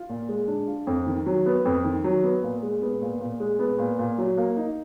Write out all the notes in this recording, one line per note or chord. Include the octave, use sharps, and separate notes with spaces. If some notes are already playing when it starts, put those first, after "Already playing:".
Already playing: F4
A#2
G#3
D4
F4
F2
D#3
F#3
B3
F2
D#3
F#3
B3
A#2
G#3
B3
A#2
A#2
G#3
B3
A#2
A#2
F#3
A#3
D#4